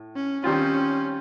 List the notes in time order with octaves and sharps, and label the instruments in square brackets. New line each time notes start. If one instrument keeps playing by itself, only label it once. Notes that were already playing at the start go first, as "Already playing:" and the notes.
Already playing: [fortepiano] A2
[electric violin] C#4
[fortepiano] D#3 G3 C4 F4 [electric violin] C#4